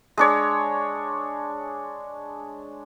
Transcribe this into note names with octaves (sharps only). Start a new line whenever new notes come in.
G#3 D4 C#5